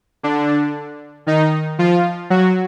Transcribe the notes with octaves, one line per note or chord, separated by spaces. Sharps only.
D3 D4
D#3 D#4
F3 F4
F#3 F#4